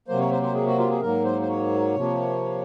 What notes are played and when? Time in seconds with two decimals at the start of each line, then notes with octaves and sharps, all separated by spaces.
0.08 C3 F#3 A#3 C5
0.20 C#5
0.32 C5
0.42 C5
0.54 G#4
0.67 F#4
0.79 F4
0.91 G#4
1.02 G#2 F#3 A#3 A#4
1.25 C5
1.41 C5
1.49 C#5
1.96 C3 F3 A#3